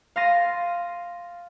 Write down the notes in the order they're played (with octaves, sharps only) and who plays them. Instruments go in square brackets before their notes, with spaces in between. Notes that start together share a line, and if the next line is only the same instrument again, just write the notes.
[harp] F5 C6 A6 A#6 D#7